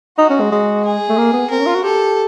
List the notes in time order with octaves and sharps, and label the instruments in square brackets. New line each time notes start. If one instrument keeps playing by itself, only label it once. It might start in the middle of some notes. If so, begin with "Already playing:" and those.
[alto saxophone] D#4 [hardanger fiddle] F#4
[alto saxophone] C#4
G#3
G#3
[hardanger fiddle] G#4
[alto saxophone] A3
A#3
B3
[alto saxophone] C4 [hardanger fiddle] A#4
[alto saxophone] C#4
F4
F#4
[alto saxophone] G4 [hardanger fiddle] A4